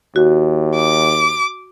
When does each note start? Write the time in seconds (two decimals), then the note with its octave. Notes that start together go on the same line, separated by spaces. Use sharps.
0.16 D#2 F#4
0.76 D6